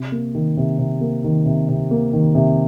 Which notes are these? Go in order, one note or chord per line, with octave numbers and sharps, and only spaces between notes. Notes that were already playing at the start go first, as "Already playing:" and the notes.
Already playing: C3
A#3
D#3
C3
C3
A#3
D#3
C3
C3
A#3
D#3
C3